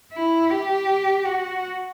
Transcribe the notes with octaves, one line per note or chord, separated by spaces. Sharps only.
E4
G4
F#4